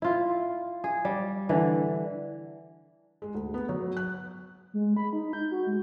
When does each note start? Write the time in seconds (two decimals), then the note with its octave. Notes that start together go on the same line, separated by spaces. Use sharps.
0.02 E4 F4
0.84 G#4
1.05 G3
1.49 D3 E3
3.22 G#3
3.35 D2
3.54 B3
3.69 F#3
3.97 F#6
4.74 G#3
4.97 B5
5.13 D#4
5.33 G6
5.51 F#4
5.67 G#3